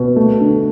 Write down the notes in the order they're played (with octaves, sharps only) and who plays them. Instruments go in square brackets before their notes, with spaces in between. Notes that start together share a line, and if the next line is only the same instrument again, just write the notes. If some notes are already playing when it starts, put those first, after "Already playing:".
Already playing: [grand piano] B2
A3
D3